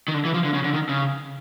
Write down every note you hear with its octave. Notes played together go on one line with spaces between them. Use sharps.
D#3
D3
E3
F3
D3
C#3
D3
D#3
C#3